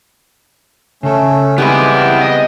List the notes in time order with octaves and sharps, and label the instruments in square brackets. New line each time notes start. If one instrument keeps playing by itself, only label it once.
[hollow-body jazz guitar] C#3 A4 [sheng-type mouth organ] A3 C#4
[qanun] G3 G#3 C4 [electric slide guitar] B3 E4 [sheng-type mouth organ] G5
[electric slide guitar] D#5